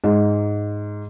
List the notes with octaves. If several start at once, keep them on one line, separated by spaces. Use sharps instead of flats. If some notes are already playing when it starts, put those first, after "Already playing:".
G#2